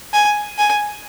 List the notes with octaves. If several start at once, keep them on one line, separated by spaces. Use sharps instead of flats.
G#5
G#5